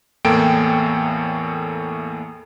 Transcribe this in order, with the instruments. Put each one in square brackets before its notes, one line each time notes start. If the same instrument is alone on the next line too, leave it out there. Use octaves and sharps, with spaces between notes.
[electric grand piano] E2 A2 A#3 A4 G5 D7